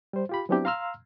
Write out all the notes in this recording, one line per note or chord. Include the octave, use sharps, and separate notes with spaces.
G3 C5
F4 G4 B5
F#3 B3 C4 D4 E4 G4
F5 A#5 C6 E6 F6